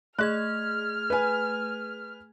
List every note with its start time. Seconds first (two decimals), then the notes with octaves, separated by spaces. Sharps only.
0.19 A3 G#4 D#5 F6 F#6 G#6
1.10 B4 G#5